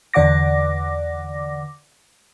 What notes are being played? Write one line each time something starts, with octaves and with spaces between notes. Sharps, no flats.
E2 D3 D5 F#5 D6 A#6